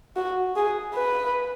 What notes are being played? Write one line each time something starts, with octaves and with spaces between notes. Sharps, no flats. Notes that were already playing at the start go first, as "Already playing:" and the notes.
F#4
G#4
B4